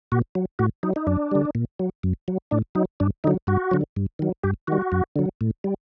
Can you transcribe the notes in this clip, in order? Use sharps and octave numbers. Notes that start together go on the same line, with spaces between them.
A#2 F#4
F#3
A2 F#4
F#3 D#4
D#4
F#2 D4
D3 G3
A#2
F#3
F#2
F#3
A2 D4
F#3 D#4
G2 D4
D3 F#3 D#4
G2 F#4
D3 F#3
G2
D#3 F#3
G2 G4
D#3 G3 F#4
F#2
D3 F#3
A2
G3